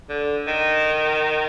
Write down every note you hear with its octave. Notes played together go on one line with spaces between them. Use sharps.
D3
D#3